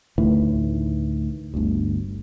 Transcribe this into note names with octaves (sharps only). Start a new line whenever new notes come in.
D2 A2 D#3 E3
G1 D2